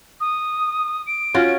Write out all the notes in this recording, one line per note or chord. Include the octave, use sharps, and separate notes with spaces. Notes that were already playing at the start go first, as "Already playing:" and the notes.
D#6
D7
C#4 F4 F#4